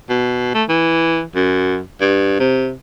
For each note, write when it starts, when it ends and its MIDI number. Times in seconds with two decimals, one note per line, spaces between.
0.09 0.52 47
0.54 0.64 57
0.69 1.23 52
1.36 1.81 42
2.01 2.39 43
2.40 2.72 48